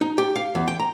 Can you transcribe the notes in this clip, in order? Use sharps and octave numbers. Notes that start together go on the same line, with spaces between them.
D#4
G4
F5
E2
G5
A#5